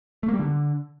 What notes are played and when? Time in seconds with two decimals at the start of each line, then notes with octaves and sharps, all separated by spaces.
0.23 A3
0.28 A#3
0.34 G3
0.39 D3